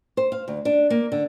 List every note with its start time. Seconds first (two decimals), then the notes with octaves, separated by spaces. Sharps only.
0.17 C5
0.32 F5
0.48 D2
0.65 D4
0.90 A#3
1.12 D3